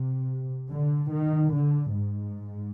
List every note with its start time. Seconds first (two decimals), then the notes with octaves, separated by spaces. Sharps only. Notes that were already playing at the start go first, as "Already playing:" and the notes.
Already playing: C3
0.71 D3
1.11 D#3
1.53 D3
1.94 G#2